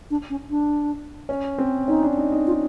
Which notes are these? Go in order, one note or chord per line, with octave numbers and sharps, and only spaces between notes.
D4
C#4
D4
C#4
C4
C#4 D#4
D4
D#4
D#4
F4